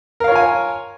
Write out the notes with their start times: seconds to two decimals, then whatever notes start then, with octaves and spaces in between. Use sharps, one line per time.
0.20 A#4
0.24 F5
0.28 C#5
0.32 F4
0.35 G#5